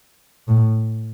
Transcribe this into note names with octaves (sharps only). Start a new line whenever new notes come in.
A2